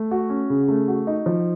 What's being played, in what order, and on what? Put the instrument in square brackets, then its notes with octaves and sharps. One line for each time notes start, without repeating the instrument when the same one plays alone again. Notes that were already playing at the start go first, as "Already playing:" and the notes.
Already playing: [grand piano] A3
F#4
C#4
C#3
A3
F#4
D#4
F3